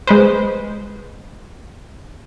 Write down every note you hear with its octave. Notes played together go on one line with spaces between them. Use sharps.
G#3 B4 C5